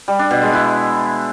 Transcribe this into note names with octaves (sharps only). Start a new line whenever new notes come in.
G3
D4
B2
G#3
E4